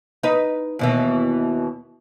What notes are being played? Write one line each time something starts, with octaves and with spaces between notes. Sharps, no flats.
D#4 B4
D#2 B2 E3